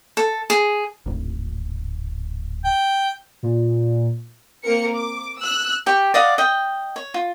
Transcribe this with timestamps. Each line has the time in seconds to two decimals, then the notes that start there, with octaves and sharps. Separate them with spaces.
0.17 A4
0.50 G#4
1.06 D1 G#1
2.65 G5
3.43 A#2
4.64 A#3 C4 A#4 C#7
4.95 D6
5.38 E6 F#6
5.86 G4 G5 C#6
6.14 D5 D#5 F5 F#5
6.38 D#5 G5
6.96 C#5
7.14 F4